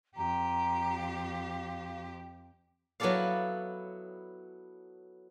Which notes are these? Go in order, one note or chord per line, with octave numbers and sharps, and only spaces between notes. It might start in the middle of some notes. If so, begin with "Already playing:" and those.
F2 G4 A#5
F5
F#3 B3 E4 A4 D5 F5